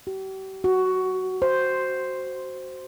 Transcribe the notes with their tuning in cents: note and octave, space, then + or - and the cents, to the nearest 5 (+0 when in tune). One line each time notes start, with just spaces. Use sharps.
G4 -40
F#4 +10
C5 +0